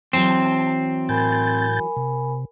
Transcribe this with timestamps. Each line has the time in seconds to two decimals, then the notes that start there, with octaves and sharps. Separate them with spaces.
0.13 E3 F#3 C4 A5
1.09 A2 A#4 G#5 B5 G6 A6
1.97 C3